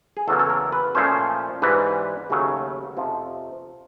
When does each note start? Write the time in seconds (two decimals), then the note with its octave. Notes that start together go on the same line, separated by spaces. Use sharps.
0.17 G#4
0.27 E2 C#3 F#3 A#3 A4
0.39 A4
0.50 A#4
0.72 B4
0.95 A#2 F3 A3 C#4 C5
1.62 G#2 E3 G3 B4
2.30 D#2 C#3 F#3 A3
2.97 F2 C3 F3